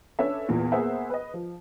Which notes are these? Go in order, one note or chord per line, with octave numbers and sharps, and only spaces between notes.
C#4 D4 A4 B4 E5
E2 A#2 E3 B3
A#3 B3 G#4 C5 E5 F#5
B4 D#5
F3